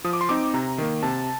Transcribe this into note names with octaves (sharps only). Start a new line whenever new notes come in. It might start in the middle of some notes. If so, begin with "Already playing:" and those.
F3 D#6
D6
C6
C4 D#4 D6
C3 A#5
D#3 A#3
C3 A5